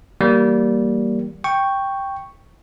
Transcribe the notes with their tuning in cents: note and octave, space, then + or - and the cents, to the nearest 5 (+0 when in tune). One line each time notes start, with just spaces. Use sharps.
E3 +0 G3 -10 A#3 +0
G5 +0 C#6 +0